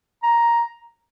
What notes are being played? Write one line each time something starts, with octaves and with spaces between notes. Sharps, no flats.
A#5